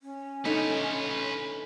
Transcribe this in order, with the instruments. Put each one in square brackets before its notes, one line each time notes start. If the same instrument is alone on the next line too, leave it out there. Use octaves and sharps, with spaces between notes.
[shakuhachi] C#4
[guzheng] D3 A3 F4 [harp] D#4 [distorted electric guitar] B4 C#5